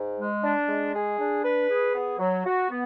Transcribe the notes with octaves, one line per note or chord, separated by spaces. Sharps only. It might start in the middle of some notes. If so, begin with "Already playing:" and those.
Already playing: G#2
G#3
D4
G#3
G#4
D4
B4
G#4
B3
F#3
F#4
B3